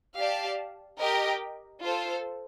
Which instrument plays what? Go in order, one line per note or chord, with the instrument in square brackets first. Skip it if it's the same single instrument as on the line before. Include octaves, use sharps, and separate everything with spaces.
[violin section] G4 D5 F5 A5
G4 A#4 D#5 G5
F4 A4 C5